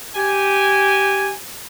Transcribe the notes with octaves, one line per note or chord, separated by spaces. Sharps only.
G4 G#5